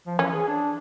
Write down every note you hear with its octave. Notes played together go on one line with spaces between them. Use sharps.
F3
E3 C#4
G#4
D4